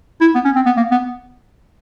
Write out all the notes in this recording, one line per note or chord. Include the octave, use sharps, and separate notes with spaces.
E4
B3
C#4
C4
B3
A#3
B3